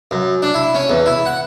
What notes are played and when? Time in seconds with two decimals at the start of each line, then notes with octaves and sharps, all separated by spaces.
0.11 F#2
0.42 D4
0.54 E4
0.75 C#4
0.90 E2
1.06 E4
1.26 F#5